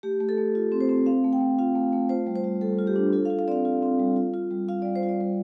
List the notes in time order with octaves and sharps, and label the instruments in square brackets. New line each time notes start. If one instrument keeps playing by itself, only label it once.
[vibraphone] A3 G4
A3
A4
A3
F4
C4
C5
C4
C4 F5
A3
G5
A3
F4 F5
A3
A3
F4 C5
G3
C5
G3
G3 A4
F4
G4
D4
F4 A4
F5
F4
F5
C4 D5
F5
F4
C4
G3
F4
F4
G3
F4 F5
G3 D5
C5
F4
D5
G3